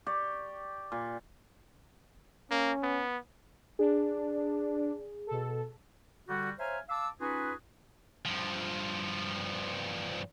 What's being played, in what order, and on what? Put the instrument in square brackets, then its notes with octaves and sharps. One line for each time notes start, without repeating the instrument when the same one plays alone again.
[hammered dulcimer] G4 D5 C#6
A#2
[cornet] A#3 [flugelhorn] C#4
[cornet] B3
[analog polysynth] D4 [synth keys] G#4
[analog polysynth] B2 A4
[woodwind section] D3 G3 F#4
C5 C#5 E5 F5 G#5 A#5
F5 A5 D6 E6
C#4 D#4 F4 F#4 G#4 B4
[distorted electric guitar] G2 F3